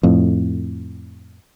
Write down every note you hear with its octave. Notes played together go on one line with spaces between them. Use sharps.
F2 A2